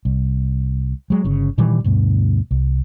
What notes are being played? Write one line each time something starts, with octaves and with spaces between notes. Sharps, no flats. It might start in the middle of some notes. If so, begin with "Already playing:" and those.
C2
F#3 G#3
G1 C#3 C#4
A#2 D#3 E3 G3
D2 G2 B2
C2